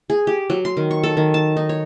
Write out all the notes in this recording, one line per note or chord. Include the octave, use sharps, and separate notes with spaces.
G#4
G4
F#3
C6
D#3
C#6
A4
D#3
A5
D#4
C#5